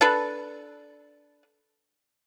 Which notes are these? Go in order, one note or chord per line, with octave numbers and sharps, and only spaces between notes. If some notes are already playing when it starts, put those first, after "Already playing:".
D4 A4 B4